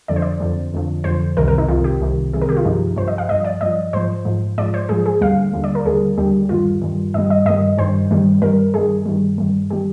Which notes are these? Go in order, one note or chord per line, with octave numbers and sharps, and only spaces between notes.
F2 D3 F3 D5
C5
D5
F2 D3 F3
F2 D3 F3
F2 D3 F3 C5
C2 C3 D#3 A#4
A#4
D#4
C2 C3 D#3 F4
G4
C2 C3 D#3
C2 C3 D#3 G#4
A#4
G4
F4
G2 F3 D#4
G2 F3 C5
D#5
F5
G2 F3 D#5
D5
G2 F3 D#5
G#2 F3 C5
G#2 F3
G#2 F3 D5
C5
G#2 F3 G#4
G#4
D#2 D3 G3 F5
D#2 D3 G3
D5
A#4
D#2 D3 G3 G#4
D#2 D3 G3 G4
G2 D#3 G3 F4
G2 D#3 G3
G2 D#3 G3 D#5
D#5
G2 D#3 G3 D#5
G2 D#3 G3 C5
G2 D#3 G3
G2 D#3 G3 A#4
G2 D#3 G3 G#4
G2 D#3 G3
G2 D#3 G3
D#3 G3 G4